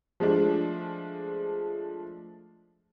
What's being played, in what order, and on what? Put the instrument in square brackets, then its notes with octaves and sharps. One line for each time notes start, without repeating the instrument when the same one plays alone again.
[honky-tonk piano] F3 G#3 A3 D4